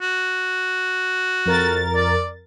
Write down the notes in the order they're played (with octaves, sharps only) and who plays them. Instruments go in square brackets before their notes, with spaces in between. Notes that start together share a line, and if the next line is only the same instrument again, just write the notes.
[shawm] F#4
[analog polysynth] F2 A#4 A6
[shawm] D5